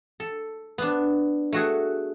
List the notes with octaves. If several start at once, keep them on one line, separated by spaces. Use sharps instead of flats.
A4
B3 D4
A3 F#4 G#4